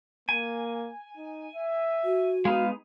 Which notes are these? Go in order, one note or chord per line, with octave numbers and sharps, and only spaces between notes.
A#3 G#5
D#4
E5
F#4
G#3 B3 D#4 F5